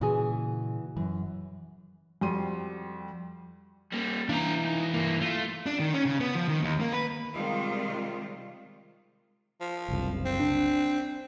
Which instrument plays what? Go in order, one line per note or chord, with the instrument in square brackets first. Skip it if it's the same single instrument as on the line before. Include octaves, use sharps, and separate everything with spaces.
[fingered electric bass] A#2 C#3 [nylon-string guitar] E3 F#4 G#4
[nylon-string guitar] F#2 [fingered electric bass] E3
[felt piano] F2 G3 F#4 C6 D#7
[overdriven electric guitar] G3 A#3
[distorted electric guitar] E3 F5 [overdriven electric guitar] D4 A#5
[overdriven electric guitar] D#4
G2 A#3
[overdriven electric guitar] A3 [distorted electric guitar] F4
[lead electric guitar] D4
D#3
C#4
C#3
B3
F3
D#3
D#2
A#3
B4
[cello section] C3 D#3 G3 G#3 F4
[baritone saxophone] F3
[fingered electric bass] F#1 C2
[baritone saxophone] C4
[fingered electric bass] D4